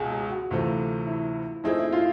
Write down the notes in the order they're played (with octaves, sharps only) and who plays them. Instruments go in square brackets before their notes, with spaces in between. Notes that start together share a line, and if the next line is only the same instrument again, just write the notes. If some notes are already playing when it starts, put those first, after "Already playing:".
Already playing: [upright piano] C#2 B2 [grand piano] G#4
[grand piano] G#4
F#4
[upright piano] D2 C3 E3 A3 [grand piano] F4
[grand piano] E4
[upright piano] F3 A3 C4 D#4 G#4 [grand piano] E4
[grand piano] E4
F4